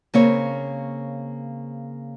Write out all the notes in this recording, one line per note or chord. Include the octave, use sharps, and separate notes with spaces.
C#3 A#3 C4 C#5